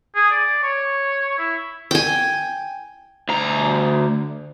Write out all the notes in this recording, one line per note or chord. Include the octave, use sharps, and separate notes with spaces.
G#4
D5
C#5
E4
G5 G#5
D2 A#5